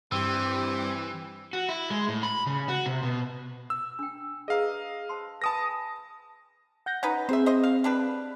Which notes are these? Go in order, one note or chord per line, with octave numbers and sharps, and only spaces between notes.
G2 E3 C4 G4 E6
F#4
E4
G#3
A2
B5
C#3
F#4
C3
B2
E6
D4 G5
G#4 B4 D#5 F5 A#5
C5 A5 C6
B4 G#5 A5 B5 D#6 A#6
F#5 G6 A#6
C#4 D#4 B4 F#5
C4 G#4 C5 E5
C5 D#5
F5
G3 D4 B4